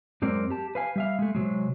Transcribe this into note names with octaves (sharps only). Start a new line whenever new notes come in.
F#2 G#3 C4 A#4 D5
G4 A5
B4 F5 G#5
G3 E5 F5
G#3 A3
C3 F#3 G#3